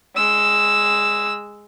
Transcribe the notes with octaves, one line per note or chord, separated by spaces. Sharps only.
G#3 E6